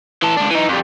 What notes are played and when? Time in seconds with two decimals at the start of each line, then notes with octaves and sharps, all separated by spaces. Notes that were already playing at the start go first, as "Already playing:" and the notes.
0.23 E3 A4
0.37 C#2 D4
0.51 E3 D#4
0.69 F2 G3